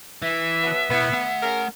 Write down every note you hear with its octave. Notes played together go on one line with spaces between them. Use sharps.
E3 E5
B2 F#3 B3
B2 B3 E4
A3 F#5
C#4 G#4 A#4